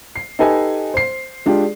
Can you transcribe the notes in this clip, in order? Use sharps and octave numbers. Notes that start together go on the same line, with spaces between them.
C7
D#4 G4 A4 B4 D#5 G#5
C5 C7
G#3 D4 F4 G4